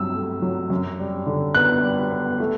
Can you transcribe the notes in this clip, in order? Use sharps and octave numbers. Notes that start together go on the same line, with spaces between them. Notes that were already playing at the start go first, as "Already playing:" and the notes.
Already playing: G2 F#3 C4 E6
A3
F#3
F#2
G3
D3
B3 F#6
G3
B3
A3